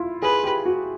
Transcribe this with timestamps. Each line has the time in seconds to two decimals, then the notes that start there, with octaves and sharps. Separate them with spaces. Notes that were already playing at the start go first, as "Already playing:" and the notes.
Already playing: E4 F4
0.22 G#4 B4
0.44 G4
0.66 F#4